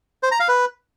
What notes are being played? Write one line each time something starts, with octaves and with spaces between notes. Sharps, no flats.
C5
A#5
F5
B4